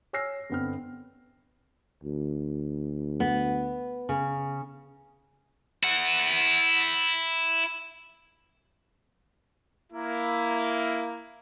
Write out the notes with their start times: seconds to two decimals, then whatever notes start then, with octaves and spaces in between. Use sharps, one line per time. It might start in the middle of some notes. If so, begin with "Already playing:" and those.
0.13 C#5 G#5 E6 F6 A#6 C7
0.50 G1 D3 B3 C4 F6
2.03 D2
3.20 B3
4.09 C#3
5.83 E4 F#5
9.93 A#3 E4